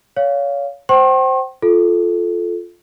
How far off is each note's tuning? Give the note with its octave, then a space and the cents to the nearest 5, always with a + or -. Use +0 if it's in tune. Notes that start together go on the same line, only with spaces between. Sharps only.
C#5 +30 F5 +0
C5 +0 G5 -35 C6 +45
F4 +0 A4 -15